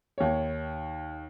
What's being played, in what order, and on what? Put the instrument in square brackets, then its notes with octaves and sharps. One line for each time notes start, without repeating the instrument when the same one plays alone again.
[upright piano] D#2 C#5